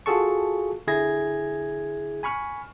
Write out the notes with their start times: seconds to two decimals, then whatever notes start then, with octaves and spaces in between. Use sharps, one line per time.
0.06 F4 F#4 G#4 A4 A5 C#6
0.87 D3 E4 G#4 G#6 A#6
2.23 G#5 B5 C#6 F6